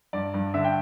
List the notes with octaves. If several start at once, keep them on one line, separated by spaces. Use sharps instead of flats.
G2 D5
G2
D3 E5
G5